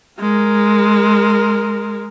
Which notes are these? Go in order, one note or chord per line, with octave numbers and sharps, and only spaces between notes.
G#3 A#4